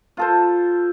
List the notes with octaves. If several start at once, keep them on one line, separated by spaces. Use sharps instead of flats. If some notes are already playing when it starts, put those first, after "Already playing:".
F4 A4 C5